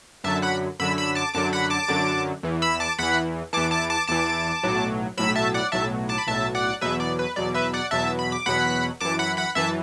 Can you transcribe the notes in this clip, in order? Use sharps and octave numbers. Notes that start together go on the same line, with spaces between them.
F#2 D3 F#3 E5 A5
F#5 B5
F#2 D3 F#3 B5 E6
B5 E6
A5 D6
F#2 D3 F#3 A5 D6
F#5 B5
A5 D6
F#2 D3 F#3
E2 E3
B5 E6
A5 D6
E2 E3 F#5 B5
E2 E3 A5 D6
A5 D6
A5 D6
E2 E3 A5 D6
B1 A2 F#3
B1 A2 F#3 B5 E6
E5 A5
D5 F#5
B1 A2 F#3 E5 A5
A5 D6
B5
B1 A2 F#3 E5 A5
D5 F#5
E2 B2 F#3 B4 E5
D5
B4
E2 B2 F#3 D5
B4 E5
D5 F#5
E2 B2 F#3 E5 A5
B5
D6
E2 B2 F#3 F#5 B5
F#2 E3 A5 D6
F#5 B5
F#5 B5
F#2 E3 E5 A5